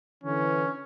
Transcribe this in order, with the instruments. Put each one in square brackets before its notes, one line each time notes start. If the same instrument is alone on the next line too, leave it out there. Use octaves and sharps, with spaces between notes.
[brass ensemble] D3 E3 [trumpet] C#4